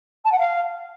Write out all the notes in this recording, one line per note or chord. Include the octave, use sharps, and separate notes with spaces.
A5
F#5
F5